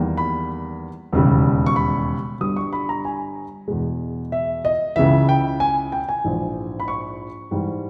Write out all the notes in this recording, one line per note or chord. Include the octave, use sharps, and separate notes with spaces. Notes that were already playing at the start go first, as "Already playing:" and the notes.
Already playing: E2 D#3 G3 A#3
B5
E1 D#2 C#3 G3
C#6
B5
G1 G2 G3 D#6
C#6
B5
A#5
G#5
E2 B2 G#3
E5
D#5
C#2 C#3 E3 E5
G5
G#5
G5
G#5
A#1 G#2 E3
B5
C#6
G#2 E3 G3